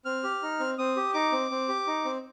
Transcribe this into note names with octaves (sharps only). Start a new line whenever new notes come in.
C4 F6
G4
D#4
C4
C4 D#6
G4
D#4 D6
C4
C4
G4
D#4
C4